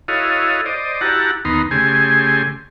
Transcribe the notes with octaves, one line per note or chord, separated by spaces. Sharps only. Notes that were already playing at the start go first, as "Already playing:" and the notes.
E4 F#4 A4 C#5 D#5 F5
C5 D5 D#5
E4 F#4 G4 F#5 A5 A#5
D#2 B3 D#4 A#5 C6
C#3 A3 G4 G#4 G#5 C6